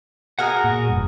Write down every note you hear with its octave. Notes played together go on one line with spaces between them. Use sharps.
F#4 G#4 A#4 F#5 D#6
A#2
F1 G2